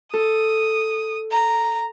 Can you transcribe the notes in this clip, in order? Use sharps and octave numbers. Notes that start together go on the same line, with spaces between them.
A4 D#6
A#5